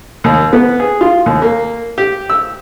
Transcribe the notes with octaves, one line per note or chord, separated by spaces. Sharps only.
D#2
B3
G#4
F4
D#2
A#3
G4
E6